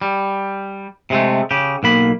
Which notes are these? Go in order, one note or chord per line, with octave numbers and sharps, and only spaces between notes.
G3
C3 G#3 A3
C#3 G4
B1 A#3 B5